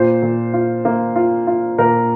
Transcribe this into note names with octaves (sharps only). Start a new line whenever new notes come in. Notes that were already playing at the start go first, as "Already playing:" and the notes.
Already playing: A#2 C5
A#2
F4
A#3
F4
F4
A#2 A#4